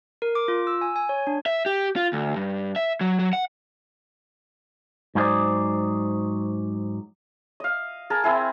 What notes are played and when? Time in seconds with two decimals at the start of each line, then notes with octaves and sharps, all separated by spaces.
0.22 A#4
0.35 D6
0.48 F4
0.67 E6
0.81 G#5
0.96 G#5
1.09 C#5
1.27 D4
1.46 E5
1.66 G4
1.96 F4
2.13 D2
2.36 G2
2.76 E5
3.01 F#3
3.19 F#3
3.33 F#5
5.15 G#2 F#3 E4 G#4 C5 D5
7.60 D#5 F5
8.10 G#4 A#4 A5
8.24 C4 E4 G#4